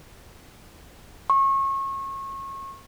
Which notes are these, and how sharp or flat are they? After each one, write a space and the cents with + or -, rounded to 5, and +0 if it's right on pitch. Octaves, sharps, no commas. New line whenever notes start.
C#6 -30